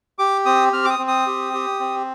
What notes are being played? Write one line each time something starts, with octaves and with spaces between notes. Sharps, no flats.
G4 D6
C4 D#6
C4 F6
D6
D#6
C4
D#6
G4
G4
C4